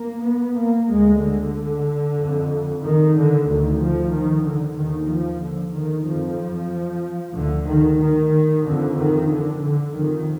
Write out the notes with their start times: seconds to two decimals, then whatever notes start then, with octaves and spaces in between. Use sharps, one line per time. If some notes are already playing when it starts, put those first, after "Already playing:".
Already playing: A#3
0.23 B3
0.56 A#3
0.88 D2 G#3
1.21 D3
2.18 F2
2.82 D#3
3.15 D3
3.47 D2 D#3
3.79 F3
4.12 D#3
4.44 D3
4.77 D#2 D#3
5.09 F3
5.41 D3
5.74 D#3
6.06 F2 F3
7.35 D2 D3
7.68 D#3
8.00 D#3
8.65 F2 D3
8.97 D#3
9.30 D3
9.62 D3
9.94 F2 D#3